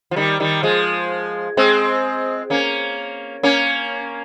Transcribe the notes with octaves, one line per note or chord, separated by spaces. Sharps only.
F3
D#3 G3
D#3 G3
F3 G#3
G#3 C4
A#3 C#4
A#3 C#4